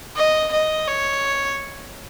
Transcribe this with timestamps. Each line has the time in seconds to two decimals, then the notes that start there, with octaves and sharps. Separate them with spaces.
0.16 D#5
0.53 D#5
0.88 C#5